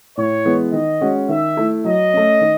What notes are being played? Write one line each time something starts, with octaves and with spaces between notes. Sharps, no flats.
A2 C#5
E3 G#3 B3
D#3 D#5
G#3 C#4 F#4
D#3 E5
A3 E4
F#3 D#5
A3 C#4
D#3